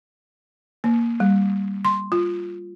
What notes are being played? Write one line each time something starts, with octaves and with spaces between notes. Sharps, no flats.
A#3
G3
C6
F4